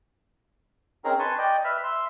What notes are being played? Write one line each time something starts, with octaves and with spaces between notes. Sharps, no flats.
C4 C#4 D#4 G#4 A#4
B4 G#5 A5 C6 C#6
D5 D#5 G5
B4 E5 B5 F6
E5 C6